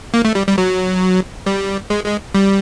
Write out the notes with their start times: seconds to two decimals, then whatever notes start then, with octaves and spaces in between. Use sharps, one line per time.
0.14 A#3
0.25 A3
0.35 G3
0.47 G3
0.58 F#3
1.46 G3
1.90 G#3
2.06 G#3
2.35 G3